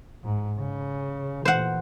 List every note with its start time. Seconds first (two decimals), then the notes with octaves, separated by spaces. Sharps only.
0.24 G#2
0.60 C#3
1.45 A#2 E3 C5 F#5